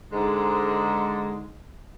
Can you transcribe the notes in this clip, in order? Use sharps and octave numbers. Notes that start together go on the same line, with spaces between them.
G#2 D3 G#3